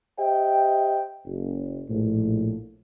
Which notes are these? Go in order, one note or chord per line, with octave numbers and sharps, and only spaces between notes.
G4 C5 D#5 E5 G5
F#1
A#1 A2